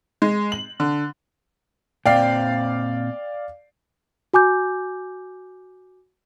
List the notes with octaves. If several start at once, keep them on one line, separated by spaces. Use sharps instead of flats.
G#3
F#7
D3
A#2 C4 D5 F5 G5 C7
F#4 G#5 D6 G6